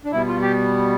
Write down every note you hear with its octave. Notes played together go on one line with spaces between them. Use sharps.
D4
B2 G3 B3 E4
F4
G4